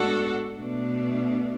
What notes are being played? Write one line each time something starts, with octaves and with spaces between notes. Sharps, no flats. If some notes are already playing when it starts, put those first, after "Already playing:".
Already playing: A2 G#3 B3 D4 F#4 A4
B2 A3 D4